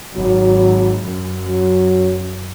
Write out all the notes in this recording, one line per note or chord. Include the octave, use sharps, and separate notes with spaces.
G#1 F#3
F#2
F#3